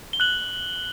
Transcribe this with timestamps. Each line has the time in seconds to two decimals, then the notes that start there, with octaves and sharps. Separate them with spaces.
0.13 G7
0.20 F#6 F#7